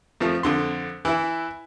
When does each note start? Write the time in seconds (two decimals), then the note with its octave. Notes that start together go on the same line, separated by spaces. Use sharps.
0.20 F2 F3 A3
0.43 F2 D3 C6
1.05 E3 E4